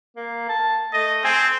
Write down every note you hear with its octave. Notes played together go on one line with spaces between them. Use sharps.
A#3
A5
A3 D#5
C4 G#5